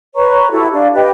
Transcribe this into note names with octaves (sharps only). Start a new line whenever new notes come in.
B4 C#5 A#5 C#6
E4 F#4 G4 A4
D4 F5
G4 B4 D#5 G5